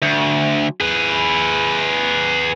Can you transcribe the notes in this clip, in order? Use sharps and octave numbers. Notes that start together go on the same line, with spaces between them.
D2
G#4 B4